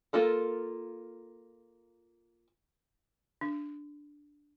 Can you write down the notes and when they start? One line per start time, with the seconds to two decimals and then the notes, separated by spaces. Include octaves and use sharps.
0.13 A#3 F4 A4 A#4
3.41 D4